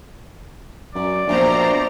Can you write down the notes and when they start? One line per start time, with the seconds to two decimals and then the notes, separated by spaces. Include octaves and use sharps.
0.95 F#2 D5
1.27 A#1 B2 C5 E5 A#5